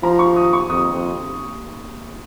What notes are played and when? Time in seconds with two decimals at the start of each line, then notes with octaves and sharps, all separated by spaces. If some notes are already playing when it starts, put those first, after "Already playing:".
0.03 F3 A#5
0.19 C#6
0.36 D#6
0.53 C#6
0.70 F2 D#6
0.93 F2